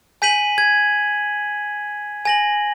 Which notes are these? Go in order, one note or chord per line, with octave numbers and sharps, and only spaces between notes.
G#5 G6 B6 D#7 F#7
G#6
G#5 A#6 F#7